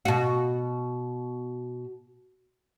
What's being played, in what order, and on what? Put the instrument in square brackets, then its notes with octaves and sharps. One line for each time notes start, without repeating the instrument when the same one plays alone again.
[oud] B2 F#4